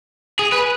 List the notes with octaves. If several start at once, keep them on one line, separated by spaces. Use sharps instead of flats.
G#4
B4